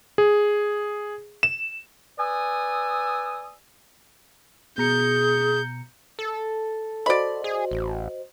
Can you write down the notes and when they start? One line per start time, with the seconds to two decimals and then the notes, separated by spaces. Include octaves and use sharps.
0.18 G#4
1.43 E7
2.18 B4 D5 G#5 D#6 E6
4.78 B2 G#4 A#5 G6 C#7
6.19 A4
7.06 F#4 C5 D5 D#5 B5
7.44 G#4
7.71 A1